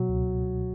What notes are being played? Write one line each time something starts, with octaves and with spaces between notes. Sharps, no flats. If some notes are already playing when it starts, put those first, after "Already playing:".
Already playing: B2 F#3
C#2